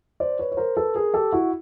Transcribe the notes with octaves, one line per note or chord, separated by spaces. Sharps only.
C5 D5
B4 C#5
C#5
A#4 C5
A4 B4
G#4 A#4
G4 A4
E4 F#4